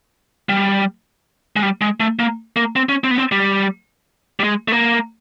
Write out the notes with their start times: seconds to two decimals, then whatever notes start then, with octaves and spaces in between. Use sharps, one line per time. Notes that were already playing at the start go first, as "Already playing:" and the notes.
0.49 G3
1.56 G#3
1.62 G3
1.81 G#3
2.00 A3
2.19 A#3
2.56 A#3
2.76 C4
2.89 C#4
3.04 C4
3.11 B3
3.18 C4
3.32 G3
4.40 G3
4.44 G#3
4.68 A3
4.72 A#3